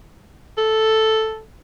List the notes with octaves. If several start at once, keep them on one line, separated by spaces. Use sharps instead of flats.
A4